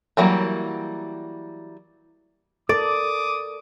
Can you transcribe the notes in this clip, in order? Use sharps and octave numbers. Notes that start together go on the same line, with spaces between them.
E3 F#3 G3 A#3
A4 A#4 D5 D6 D#6